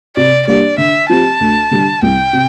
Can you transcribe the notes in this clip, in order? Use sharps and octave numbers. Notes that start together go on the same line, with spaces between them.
C3 D5
G3 A#3 D4 G4 D5
D3 E5
F3 C4 G4 A5
D2
D3 G3
C2 G5
C3